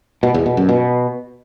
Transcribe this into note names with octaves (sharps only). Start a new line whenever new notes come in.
B2
E2
B2
F#2
B2